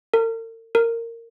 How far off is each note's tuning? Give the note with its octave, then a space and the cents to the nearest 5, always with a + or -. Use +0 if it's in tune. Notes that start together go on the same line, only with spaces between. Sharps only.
A#4 -45
A#4 -15